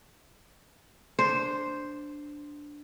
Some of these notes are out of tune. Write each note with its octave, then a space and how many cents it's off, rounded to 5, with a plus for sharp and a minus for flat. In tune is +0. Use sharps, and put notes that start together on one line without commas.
D4 +0 C5 +0